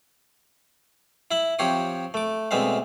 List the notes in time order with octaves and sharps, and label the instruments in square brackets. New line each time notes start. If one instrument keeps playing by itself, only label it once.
[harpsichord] E4 E5 B5
F3 C4 G4 C#5 C6 D#6
A3 D6
D2 B2 G#3 C4 E5 F5